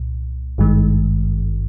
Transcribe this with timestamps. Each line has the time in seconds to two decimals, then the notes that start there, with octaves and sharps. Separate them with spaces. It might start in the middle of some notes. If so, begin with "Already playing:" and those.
Already playing: C2 A#2
0.58 G#1 G2 D#3 G#3